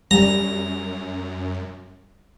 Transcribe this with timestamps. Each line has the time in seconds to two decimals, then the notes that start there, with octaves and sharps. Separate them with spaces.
0.11 F#2 G3 A#5